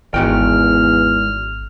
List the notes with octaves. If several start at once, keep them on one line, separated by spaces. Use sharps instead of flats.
G#1 E2 G#2 F#4 G5 F6